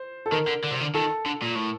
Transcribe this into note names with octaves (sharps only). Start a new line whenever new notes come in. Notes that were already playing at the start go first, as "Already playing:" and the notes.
Already playing: C5
A4
D#3 A#4
D3
D3
C3
D3
D#3 A4
D3
A#2
A2